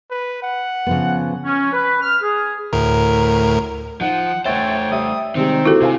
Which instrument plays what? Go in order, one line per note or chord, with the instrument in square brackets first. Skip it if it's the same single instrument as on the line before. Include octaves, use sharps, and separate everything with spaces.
[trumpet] B4
F#5
[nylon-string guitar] C#3 F3 B3
[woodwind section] C#4
B4
F6
G#4
[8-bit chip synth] D2 A2 A#4
[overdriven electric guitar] F3 [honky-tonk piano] D#4 [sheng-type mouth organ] F#5
[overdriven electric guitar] A3 C5 [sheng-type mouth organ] C#5 G5 [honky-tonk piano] E5 A6
[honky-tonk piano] G3 E5 G5 [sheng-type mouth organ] D#6
[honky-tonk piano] C3 G3 G#3 [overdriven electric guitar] D#3 [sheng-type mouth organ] C4
[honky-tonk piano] A#3 G4 [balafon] E4 F#4 A4
[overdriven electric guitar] C3 [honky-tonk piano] C5 F5 G#5